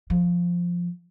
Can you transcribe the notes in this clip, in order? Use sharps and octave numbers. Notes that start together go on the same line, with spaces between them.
F3